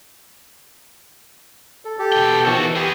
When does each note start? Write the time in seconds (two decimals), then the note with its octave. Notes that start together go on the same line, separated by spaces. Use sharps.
1.85 A4
1.99 G4 A4
2.12 B2 G5
2.45 B2 D#3 F3 F#4 A4
2.58 E3
2.76 B3 G4 G#4 E6